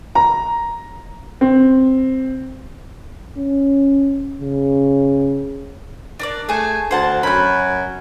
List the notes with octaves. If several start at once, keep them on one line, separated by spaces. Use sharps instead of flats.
A#5
C4
C#4
C#3
D4 A#4 D5
A3 G#4 G#5
D2 C5 F#5 A5
F#2 B5 F#6